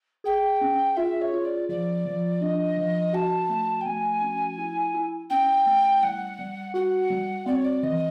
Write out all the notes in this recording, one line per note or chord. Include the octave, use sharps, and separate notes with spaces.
G#4 G5
C#4
F4 E5
C#5
F4
D5
F3 D5
F3
D4 D#5
F3
F#4 A5
A3
G5
A3 G#5
C#4
E4
E4
C#4 G5
A3
G3 F#5
G3
F#4 F#5
G3
C4 D5
C#5
D5
E3 D#5